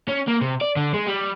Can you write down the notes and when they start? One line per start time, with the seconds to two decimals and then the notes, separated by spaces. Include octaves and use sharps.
0.09 C#4
0.28 A#3
0.41 C3
0.61 D5
0.76 D3
0.94 G#3
1.06 G3